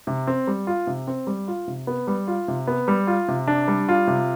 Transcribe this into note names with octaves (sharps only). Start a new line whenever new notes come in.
C3
C4
G3
F4
C3
C4
G3
F4
C3
B3
G3
F4
C3
B3
G3
F4
C3
D4
G3
F4
C3